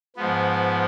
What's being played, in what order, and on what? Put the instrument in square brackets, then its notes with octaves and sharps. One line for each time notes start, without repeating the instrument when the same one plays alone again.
[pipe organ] G#2 F3 B3